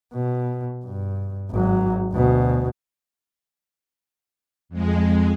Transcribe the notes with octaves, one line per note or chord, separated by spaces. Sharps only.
B2
G2
G#1 F#3
D2 B2
F2 G#3